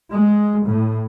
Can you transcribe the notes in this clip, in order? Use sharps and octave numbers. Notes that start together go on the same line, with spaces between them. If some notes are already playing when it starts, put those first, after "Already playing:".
G#3
A2